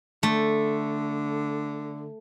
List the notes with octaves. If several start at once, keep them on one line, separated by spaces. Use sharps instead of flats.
D3 A3